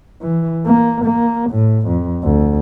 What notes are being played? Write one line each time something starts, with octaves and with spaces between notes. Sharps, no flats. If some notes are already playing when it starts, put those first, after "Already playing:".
E3
A#3
A#3
A2
F2
D2